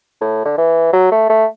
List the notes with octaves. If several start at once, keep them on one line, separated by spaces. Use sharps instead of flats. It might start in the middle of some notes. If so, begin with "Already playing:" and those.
A2
D3
E3
F#3
A3
A3